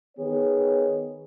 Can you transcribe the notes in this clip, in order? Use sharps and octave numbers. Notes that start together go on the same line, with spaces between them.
D#3 B3 G#4 C#5